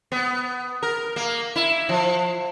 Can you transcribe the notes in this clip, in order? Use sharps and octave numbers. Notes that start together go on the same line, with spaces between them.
B3
A#4
A#3
E4
F3